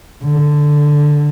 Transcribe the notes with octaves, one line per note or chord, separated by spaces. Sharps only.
D3